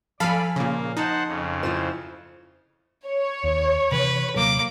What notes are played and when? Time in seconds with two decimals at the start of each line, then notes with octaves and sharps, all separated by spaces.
0.20 F3 A4 D5 F5 G#5 B5
0.56 A#2 C#3 A#3
0.97 D#4 C5 F#5 A5
1.26 F2 C#3
1.63 E4 F4 C5
3.07 C#5
3.44 D#2
3.92 C3 E3 B4
4.36 D#1 C3 F#3 A#3 D6